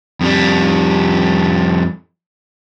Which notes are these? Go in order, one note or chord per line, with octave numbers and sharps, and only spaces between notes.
F2 G3